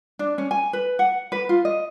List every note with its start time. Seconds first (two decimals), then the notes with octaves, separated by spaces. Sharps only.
0.19 D4
0.38 C#4
0.51 G#5
0.73 B4
0.99 F#5
1.32 B4
1.49 F4
1.65 D#5